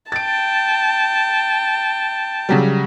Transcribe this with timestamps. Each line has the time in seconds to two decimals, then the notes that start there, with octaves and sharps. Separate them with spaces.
0.12 G5 A5 A6 D7
2.49 C#3 F#3 G3